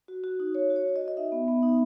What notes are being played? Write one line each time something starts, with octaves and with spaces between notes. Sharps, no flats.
F#4
F#4
D#4
F#4 C#5
F#4
C#5
F#4
D#5
F#4
D#5
D#4 E5
B3
B3
D#4